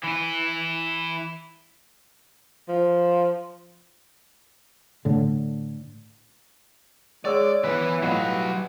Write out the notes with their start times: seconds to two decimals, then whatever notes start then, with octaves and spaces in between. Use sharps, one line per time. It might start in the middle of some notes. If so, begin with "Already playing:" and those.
0.04 E3 E4
2.69 F3
5.05 A2 D3
7.25 G#3 C#5 D5 D6 E6
7.64 E3 B3 B4
8.03 A2 F#3 F4 B4 D#5
8.18 G3